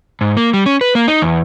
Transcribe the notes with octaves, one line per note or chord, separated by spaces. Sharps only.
G#2
A#3
G3
C#4
B4
A#3
D#4
E2